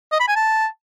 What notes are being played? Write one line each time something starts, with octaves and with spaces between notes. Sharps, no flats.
D#5
B5
G#5
A5